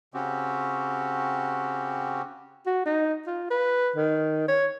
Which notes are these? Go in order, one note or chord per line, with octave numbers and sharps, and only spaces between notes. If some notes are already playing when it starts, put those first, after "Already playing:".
C#3 C4 C#4 F#4 G4
F#4
D#4
F4
B4
D#3
C#5